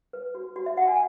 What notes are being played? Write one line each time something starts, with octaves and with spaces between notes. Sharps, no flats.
B4
F#4
F#4
E5
F#4 F#5
G#5